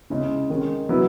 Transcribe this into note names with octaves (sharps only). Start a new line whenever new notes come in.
C#3 G#3 C#4 E4
D#3 G#3 C#4
F#3 B3 E4